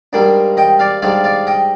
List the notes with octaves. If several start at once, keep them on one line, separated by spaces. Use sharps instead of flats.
G#2 G3 A#3 D4
D#5 G5
D5 F5
G#2 G3 D4 D5 F5
D5 F5
D#5 G5